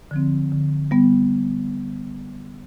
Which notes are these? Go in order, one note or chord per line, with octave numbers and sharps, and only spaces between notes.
D3 F3 C4
D3
G3 B3